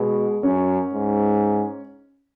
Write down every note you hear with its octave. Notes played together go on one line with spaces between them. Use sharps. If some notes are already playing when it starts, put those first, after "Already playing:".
Already playing: B2 G#3
F#2 C#4
G#2